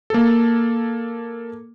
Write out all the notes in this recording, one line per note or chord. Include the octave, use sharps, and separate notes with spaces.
A#3 A4